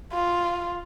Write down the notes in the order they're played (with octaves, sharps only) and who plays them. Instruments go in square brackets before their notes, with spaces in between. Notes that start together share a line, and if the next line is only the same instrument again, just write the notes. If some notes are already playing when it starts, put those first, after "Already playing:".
[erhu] F4